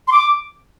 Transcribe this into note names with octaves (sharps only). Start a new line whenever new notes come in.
C6
D6